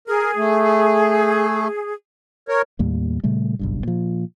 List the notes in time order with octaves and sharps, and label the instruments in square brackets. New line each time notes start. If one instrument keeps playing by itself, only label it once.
[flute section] G#4 [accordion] A#4
[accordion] A3
A#4 C#5
[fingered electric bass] D#2 A2 G3 A#3
A#2 C#3 G3 A3
F#1 B1 G2
A#2 F3